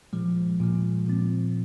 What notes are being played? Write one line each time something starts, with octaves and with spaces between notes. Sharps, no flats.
A#2 F3 G#3
A#2 F3 G#3
A#2 F3 C4